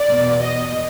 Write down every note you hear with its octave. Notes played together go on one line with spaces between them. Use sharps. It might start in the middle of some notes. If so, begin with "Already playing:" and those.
Already playing: D5
E2 B2
D#5